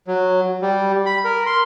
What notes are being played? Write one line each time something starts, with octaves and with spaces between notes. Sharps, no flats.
F#3
G3
B5
A#4
C6